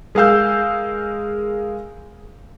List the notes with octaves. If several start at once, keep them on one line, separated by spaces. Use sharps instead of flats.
G#3 G#4 A#4 F5 E6 G6